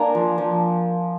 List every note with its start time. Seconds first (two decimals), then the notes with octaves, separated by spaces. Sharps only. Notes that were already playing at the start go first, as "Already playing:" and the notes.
Already playing: A#3 D4 G#5 A#5
0.15 F3
0.38 F3